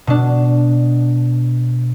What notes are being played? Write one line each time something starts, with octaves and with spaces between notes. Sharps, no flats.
B2 D4